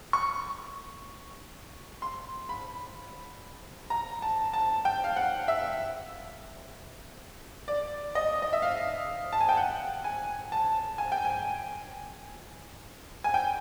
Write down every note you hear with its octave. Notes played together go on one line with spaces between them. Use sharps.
C#6
C6
B5
A#5
A5
A5
G5
F5
F#5
E5
D5
D#5
D#5
E5
F5
A5
G#5
G5
F#5
G#5
A5
G#5
G5
G#5
G#5
G5